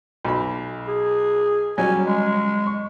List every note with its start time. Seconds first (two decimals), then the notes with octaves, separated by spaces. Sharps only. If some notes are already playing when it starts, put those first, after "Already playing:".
0.25 B1 B5
0.88 G#4
1.78 F#3 G3 C#4 G#5
2.06 G#3
2.67 C#6